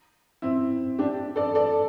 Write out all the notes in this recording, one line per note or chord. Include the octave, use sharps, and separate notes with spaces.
C4 E4
D4 G4
A4 D5
A4 D5